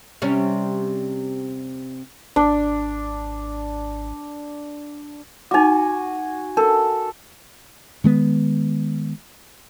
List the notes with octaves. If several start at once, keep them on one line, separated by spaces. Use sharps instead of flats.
C3 G3 C#4
G#1 D4
D#4 F#4 G#5 D6
D4 A4 A#4
D#3 G#3 B3